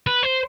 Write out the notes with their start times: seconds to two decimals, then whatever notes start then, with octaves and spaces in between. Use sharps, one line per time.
0.07 B4
0.23 C5